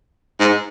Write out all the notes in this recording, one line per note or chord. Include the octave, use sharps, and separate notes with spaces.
G#2